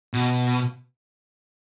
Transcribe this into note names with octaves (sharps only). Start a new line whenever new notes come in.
B2